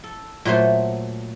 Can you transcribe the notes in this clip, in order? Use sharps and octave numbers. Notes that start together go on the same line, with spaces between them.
A4
A#2 F#3 A3 C5